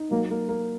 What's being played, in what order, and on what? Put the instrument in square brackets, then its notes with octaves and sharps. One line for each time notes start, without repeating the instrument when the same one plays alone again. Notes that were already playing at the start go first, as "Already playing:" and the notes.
Already playing: [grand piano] D#4
[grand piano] F#3 [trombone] A#3
[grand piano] A#3
A#3